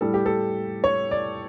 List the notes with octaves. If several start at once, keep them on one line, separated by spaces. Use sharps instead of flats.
A2 G3 A4
G4
A4
C#5
D5